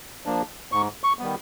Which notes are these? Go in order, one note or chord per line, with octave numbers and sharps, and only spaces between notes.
F3 A#3 D4
G#2 C#6
C#6
D#3 G3 B3